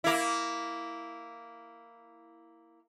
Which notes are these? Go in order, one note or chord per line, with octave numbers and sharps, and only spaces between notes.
A#3 E4